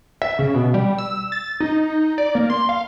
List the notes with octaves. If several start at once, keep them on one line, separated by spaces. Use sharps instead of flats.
E5
C#3
B2
G3
E6
A6
D#4
D5
A#3
C6
F5